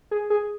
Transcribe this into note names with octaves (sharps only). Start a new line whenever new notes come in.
G#4
G#4